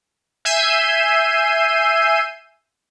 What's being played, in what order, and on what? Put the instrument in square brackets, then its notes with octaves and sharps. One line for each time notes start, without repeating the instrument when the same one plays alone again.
[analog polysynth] E5 G#5 E6 G6 C7 D#7